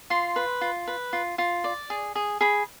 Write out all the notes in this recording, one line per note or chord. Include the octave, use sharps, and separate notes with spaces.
F4 C6
B4
F4
B4
F4
F4
D5
G#4
G#4
G#4 B5